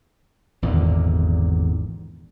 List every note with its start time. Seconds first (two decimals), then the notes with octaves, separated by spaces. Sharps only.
0.62 G#1 E2 A#2 D3